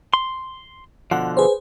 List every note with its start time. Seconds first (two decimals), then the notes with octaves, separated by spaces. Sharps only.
0.14 C6
1.11 B2 D3 F3 F#5
1.37 G#4 B4 C5